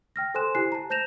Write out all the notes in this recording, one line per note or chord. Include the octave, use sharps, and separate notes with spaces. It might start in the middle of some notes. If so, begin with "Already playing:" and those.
G5 F6 A#6
A4 C5 G#5 C6 F#6 E7
E4 G4 C5 G#5 F#6 C7
A5 A#5
C5 A5 G6 A#6 E7 F7